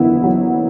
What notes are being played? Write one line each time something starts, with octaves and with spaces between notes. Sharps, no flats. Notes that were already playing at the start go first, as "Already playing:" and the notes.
Already playing: F#1 E2 D3 B3 E4
F#3